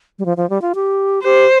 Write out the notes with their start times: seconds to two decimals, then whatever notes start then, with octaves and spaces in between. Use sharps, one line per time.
0.19 G3
0.25 F3
0.37 F3
0.50 G3
0.62 F4
0.75 G4
1.23 G4 C5